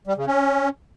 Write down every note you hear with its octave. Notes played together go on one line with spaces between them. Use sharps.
G3
C#3
C#4